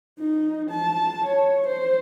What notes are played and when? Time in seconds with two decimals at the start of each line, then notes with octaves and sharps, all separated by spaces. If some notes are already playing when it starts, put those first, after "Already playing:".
0.19 D#4
0.69 A5
1.26 C#5
1.67 C5